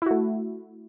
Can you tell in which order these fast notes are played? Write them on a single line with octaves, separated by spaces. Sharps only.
E4 F#4 A3